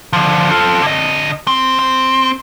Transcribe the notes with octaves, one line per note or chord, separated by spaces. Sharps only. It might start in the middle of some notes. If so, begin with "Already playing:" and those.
D3 F3
F4 A4
D3 D#5
C4
C4